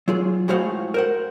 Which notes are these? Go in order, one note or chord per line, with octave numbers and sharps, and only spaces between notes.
F#3 F4 G#4
A2 G#3 F#4 C5 F5 F#5
A#4 C5 F#5